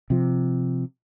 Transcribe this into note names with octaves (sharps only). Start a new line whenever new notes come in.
C3 F3